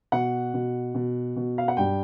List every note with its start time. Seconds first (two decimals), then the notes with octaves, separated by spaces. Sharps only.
0.12 B2 F#5
0.54 B2
0.95 B2
1.36 B2
1.58 F5
1.68 F#5
1.77 G2 G5